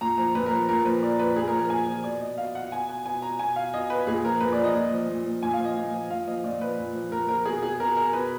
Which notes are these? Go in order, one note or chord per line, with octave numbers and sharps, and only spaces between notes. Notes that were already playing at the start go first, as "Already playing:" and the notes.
A#2 A#5
F3 A#5
A#2 B4
A#4
F3
A#2 A#4
F3 B4
A#2 D5
F3 B4
A#2 G#4
A#4
F3
A#4
A#2 G#5
F3
B2 D5
D#5
B2 F5
F#5
B2 G#5
G#5
B2 G#5
A#5
B2 G#5
F5
B2 D#5
B4
A#2 G#4
F3 A#4
A#2 B4
D5
F3
D#5
A#2
F3
A#2
F3
A#2 G#5
F5
F3
D#5
A#2
F3
A#2 F5
F3 D#5
A#2 D5
F3 B4
A#2
F3
A#2 A#4
F3 A#4
B2 G#4
G#4
B2 A#4
A#4
B2 B4